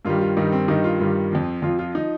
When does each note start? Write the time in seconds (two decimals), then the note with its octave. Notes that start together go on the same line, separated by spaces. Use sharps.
0.05 G2 D#3 G3 F4
0.21 F4
0.37 G2 D#3 G3 D#4
0.52 C4
0.68 G2 D#3 G3 D#4
0.84 F4
1.00 G2 D#3 G3 F4
1.32 F2 F3
1.62 F2 F3 F4
1.79 F4
1.95 F3 D#4